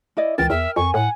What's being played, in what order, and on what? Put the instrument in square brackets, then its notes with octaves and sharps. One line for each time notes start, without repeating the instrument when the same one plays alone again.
[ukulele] E4 D5 D#5
[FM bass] C#2 [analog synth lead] E3 [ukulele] A#4 G5 [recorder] A6
[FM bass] E2 [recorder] E5 [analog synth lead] F6
[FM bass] F2 [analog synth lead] G#5 [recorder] C#6
[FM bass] A2 [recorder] F#5